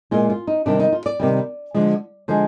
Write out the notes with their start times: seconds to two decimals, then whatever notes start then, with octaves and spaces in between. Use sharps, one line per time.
0.11 A#2 G#3 F4
0.30 F4
0.47 D#4
0.66 C3 D#3 G3 D4
0.80 D#4
0.92 F4
1.06 D5
1.20 C3 D#3 G3
1.74 D3 F3 G#3
2.28 D3 F3 G#3 C5